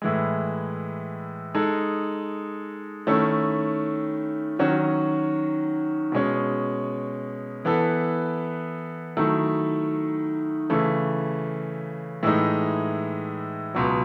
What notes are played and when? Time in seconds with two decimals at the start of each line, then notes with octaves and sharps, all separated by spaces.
0.02 A2 E3 G#3
1.54 G#3 D#4 A4
3.07 D#3 A3 C#4 E4
4.59 D#3 F#3 C#4 F#4
6.12 B2 G#3 C#4
7.65 E3 B3 E4 A4
9.17 D#3 F#3 A3 E4
10.70 C#3 E3 A3
12.23 A2 E3 G#3 D#4
13.74 C#2 B2 F#3